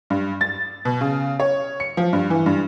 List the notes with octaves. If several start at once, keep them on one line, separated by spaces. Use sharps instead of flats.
G2
A6
B2
C#3
C#5
C#7
F3
G2
E3
G2